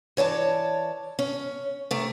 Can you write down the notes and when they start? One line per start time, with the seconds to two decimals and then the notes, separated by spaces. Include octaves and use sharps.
0.17 E3 C#5 D5 A5
1.19 C#4
1.91 C3 A3 A#4